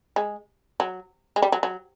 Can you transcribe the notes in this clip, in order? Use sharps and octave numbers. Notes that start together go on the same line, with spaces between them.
G#3
F#3
G#3
G3
F#3
F#3